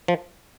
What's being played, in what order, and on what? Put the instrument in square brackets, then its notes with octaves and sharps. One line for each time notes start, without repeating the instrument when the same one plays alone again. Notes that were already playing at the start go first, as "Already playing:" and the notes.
[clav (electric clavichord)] F3